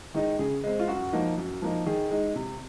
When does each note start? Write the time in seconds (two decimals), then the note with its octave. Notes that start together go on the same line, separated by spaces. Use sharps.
0.14 D#3 G#3 D#4
0.39 C#3 G#4
0.64 G#3 C4
0.80 F4
0.88 F#2 F#4
1.13 F3 A#3 D#4
1.38 F#2
1.62 F3 A#3 D#4
1.86 D#3 G#4
2.11 G#3 D#4
2.36 C3